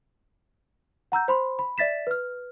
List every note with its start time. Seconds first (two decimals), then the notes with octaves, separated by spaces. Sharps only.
1.12 F#5 A#5 E6 G6
1.28 C5 B5 C6
1.59 B5
1.78 D5 E5 A6 B6 E7
2.07 B4 F6